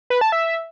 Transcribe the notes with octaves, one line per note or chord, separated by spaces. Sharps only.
B4
A5
E5